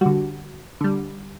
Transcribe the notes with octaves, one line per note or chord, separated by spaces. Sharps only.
D3 G3 F#4
D3 G3